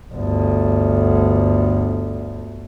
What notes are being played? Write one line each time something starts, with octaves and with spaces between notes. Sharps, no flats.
G1 D2